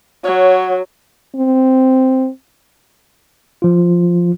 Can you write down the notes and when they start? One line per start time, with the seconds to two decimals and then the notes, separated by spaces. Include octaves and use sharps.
0.25 F#3 C#5
1.36 C4
3.62 F3 F4